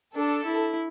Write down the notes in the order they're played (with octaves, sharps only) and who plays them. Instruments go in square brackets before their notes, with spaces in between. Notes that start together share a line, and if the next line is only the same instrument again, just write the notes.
[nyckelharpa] D4 [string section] A4
[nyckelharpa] E4